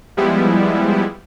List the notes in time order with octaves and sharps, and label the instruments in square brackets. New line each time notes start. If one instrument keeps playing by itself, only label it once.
[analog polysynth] F3 G3 G#3 B3 E4